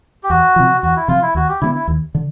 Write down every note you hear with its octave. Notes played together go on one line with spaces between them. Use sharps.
G4
E2 F#4
C3 F3
E2 F#4
E4
C3 F3 F4
E4
D#2 F#4
G4
D3 F#3 B3 E4
E4
D#2
D3